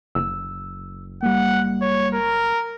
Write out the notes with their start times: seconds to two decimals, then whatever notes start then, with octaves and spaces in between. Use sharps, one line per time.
0.15 F#1 E6
1.23 G3 A#3 F#5
1.81 C#5
2.14 A#4